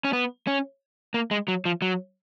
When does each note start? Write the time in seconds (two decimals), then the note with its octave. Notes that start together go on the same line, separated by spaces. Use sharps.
0.04 C#4
0.13 B3
0.47 C#4
1.14 A#3
1.31 G#3
1.48 F#3
1.65 F3
1.82 F#3